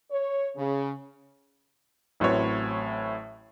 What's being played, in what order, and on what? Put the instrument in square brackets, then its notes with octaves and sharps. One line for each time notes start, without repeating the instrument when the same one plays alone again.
[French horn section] C#5
C#3
[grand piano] A1 A2 F#3 C4 B4 C#5